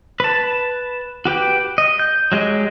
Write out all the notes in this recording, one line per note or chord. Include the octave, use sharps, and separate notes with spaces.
B4 A5
F#4 G4 B4 G5
D#5
G6
F#3 G#3 G4 D#5